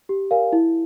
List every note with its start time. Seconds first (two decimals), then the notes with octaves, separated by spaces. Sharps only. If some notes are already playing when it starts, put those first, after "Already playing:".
0.09 G4
0.31 A#4 D5 F5 G#5
0.53 E4